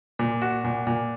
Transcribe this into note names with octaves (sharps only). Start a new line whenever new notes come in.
A#2
F#4
A#2
A#2